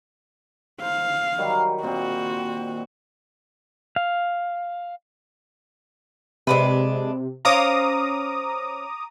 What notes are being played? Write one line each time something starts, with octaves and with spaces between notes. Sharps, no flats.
C5 F5
D#3 F#3 G3
A#2 C4 F#4
F5
C3 G#3 D4 B4
C#4 C5 F5 A#5 D6 D#6